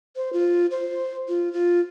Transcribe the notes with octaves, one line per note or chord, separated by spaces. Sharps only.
C5
F4
C5
F4
F4